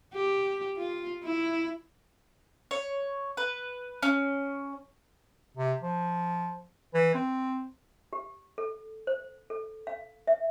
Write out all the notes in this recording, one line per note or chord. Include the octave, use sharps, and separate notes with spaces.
G4
F4
E4
C#5
B4
C#4
C3
F3
E3
C4
G4
A4
C5
A4
F5
E5